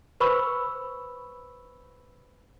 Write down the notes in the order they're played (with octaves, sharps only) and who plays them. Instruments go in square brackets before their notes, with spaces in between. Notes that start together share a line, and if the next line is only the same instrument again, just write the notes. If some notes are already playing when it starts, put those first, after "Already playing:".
[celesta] B4 C5 B5 C#6 E6